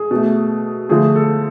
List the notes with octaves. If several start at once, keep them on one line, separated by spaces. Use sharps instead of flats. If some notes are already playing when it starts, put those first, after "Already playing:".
Already playing: G#4
B2 A3
D3 F3 A3 G#4
A4